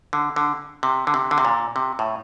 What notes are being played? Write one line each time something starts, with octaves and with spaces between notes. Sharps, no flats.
D3
D3
C3
D3
C3
D3
C3
A#2
C3
A2